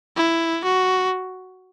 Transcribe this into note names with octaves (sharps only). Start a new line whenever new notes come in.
E4
F#4